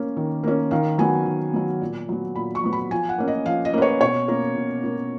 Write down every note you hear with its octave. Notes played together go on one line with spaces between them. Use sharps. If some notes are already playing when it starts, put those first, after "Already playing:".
Already playing: A#3 C#4
D#3
A#3 C#4
D#3 F5
F#3 B3 G#5
D#3
F#3 B3
A#2
F#3 B3
A#2 B5
C#6
F#3 B3
B5
F3 G#5
F#5
A#3 C#4
D#5
F3 F5
D#5
A#3 C#4 B4
C#5
B2 C#5
A#3 C#4 A#4
B2
A#3 C#4